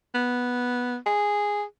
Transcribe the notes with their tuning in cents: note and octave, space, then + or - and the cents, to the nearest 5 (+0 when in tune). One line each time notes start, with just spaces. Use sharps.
B3 -5
G#4 -10